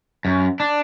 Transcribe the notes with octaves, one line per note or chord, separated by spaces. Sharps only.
F#2
D4